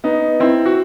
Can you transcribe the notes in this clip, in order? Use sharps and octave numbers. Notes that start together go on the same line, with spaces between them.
B3 D#4
C4 E4
F#4